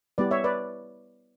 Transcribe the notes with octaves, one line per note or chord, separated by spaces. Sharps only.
G3 B3 E4 G4 B4 D5
C#5 E5
B4 D5